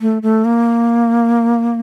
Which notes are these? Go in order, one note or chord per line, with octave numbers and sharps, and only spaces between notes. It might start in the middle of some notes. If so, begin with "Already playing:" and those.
A3
A3
A#3